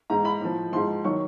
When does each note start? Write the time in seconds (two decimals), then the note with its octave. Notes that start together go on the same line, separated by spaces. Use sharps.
0.10 G#2 E3 A#5
0.25 B5
0.41 A2 F3
0.72 G#2 F3 C6
1.04 D#3 F#3 C#6